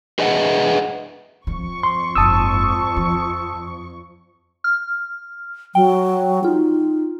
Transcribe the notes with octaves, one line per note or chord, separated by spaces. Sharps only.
G#4 B4 D#5 E5 F#5
F2 F3 F#3 C#6
C6
F#1 G#2 A5 D#6 E6
F3
F6
F#3 G5
D#4 F4